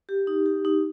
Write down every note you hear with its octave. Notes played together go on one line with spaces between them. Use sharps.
G4
D#4
G4
D#4